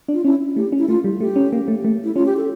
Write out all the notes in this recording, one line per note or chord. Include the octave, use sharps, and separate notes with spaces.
D4
F4
C#4 E4
A3 G4
C#4
E4
A3 F4
G3
A3 G4
C#4
A#3
A3
A3
E4
C#4 F4
G4
A4